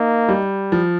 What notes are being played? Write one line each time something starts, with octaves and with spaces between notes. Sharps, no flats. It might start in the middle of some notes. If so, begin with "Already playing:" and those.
Already playing: A#3 D#4
G3
F3